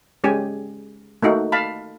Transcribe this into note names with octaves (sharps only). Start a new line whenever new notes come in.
G#3 C#4 G4 G#5
A3 A#3 D#4 F#4
F5 A5 B5